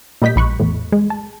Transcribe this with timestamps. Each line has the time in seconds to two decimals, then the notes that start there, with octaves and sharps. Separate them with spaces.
0.22 A#2 G3 D#5 G6 B6
0.36 A#1 B5 C#6 F#6
0.60 E2 A2
0.92 G#3
1.10 A5